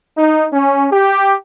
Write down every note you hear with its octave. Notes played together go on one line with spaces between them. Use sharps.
D#4
C#4
G4